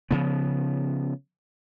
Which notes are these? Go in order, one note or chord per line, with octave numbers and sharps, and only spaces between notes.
C#3 F3 B3